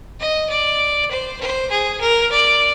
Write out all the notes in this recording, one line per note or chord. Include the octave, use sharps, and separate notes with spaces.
D#5
D5
C5
C5
G#4
A#4
D5